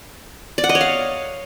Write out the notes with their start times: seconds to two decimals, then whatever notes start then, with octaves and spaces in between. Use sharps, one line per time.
0.58 D5
0.64 F#5
0.69 D#5
0.75 C#5
0.81 F5